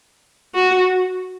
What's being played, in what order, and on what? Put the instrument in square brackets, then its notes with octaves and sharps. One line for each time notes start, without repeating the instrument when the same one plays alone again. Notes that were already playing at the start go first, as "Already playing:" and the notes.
[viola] F#4